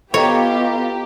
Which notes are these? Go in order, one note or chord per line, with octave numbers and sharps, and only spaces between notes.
B3 F4 G4 A4 C#5 D#5 A#5